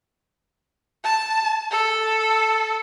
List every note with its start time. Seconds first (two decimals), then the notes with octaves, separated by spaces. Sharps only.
1.04 A5
1.71 A4